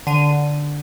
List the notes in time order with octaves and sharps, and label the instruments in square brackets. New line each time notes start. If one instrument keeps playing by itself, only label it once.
[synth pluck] D3 D#7